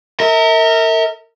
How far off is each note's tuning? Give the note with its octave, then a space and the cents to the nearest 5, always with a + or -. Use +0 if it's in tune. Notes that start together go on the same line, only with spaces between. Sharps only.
A#4 -30 E5 -35